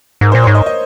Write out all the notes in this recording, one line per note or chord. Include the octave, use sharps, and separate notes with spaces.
G#2 A#4
A#2 C5
G#2 C#5
D#5
D#5